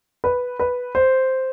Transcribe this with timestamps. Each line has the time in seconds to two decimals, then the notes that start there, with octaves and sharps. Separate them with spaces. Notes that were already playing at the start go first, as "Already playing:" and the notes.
0.24 B4
0.59 B4
0.95 C5